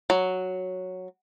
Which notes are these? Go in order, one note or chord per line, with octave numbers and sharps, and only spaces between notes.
F#3